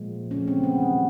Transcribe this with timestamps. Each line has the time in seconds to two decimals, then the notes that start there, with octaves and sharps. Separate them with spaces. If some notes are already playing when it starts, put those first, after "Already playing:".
Already playing: A#2 F3 G#3
0.31 C#3 F3 A3 C#4
0.48 C4
0.63 B3
0.80 D#3 G3 A#3